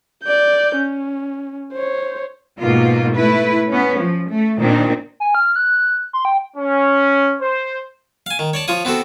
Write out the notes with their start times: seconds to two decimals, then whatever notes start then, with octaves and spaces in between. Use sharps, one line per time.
0.24 D5 G6
0.77 C#4
1.73 C5 C#5
2.59 G#2 B2 A#3 F4
3.15 A3 E4 B4
3.69 B3 C#4
3.99 F3
4.29 A3
4.60 A#2 D#3 C4 D4
5.20 G#5
5.35 F6
5.56 F#6
6.13 C6
6.25 G5
6.57 C#4
7.41 C5
8.26 F5 G#5
8.39 D#3
8.54 C#5 D5 A5
8.68 F3 F4 C#5 D#6
8.85 B3 C4 F#4 A4